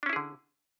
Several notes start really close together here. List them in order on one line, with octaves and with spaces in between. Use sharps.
D4 C#4 E4 G#4 D3